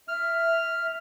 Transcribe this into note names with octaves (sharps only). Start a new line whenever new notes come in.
E5 F6